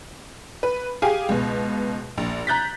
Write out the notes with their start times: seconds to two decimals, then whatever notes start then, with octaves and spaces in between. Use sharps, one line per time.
0.63 B4
1.02 G4 G#4 F5 G#5
1.29 C#2 B2
2.18 A#1
2.47 A#5 F#6 G6 A6 B6